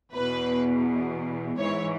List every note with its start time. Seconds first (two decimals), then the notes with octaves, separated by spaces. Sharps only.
0.14 E2 B2 B4
1.59 G#2 E3 C#5